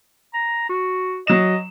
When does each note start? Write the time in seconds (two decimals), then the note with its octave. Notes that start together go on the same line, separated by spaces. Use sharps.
0.34 A#5
0.69 F#4
1.27 F#3 D#5 E7